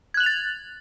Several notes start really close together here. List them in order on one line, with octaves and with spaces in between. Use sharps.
G#6 F#6 F#7 F7 A6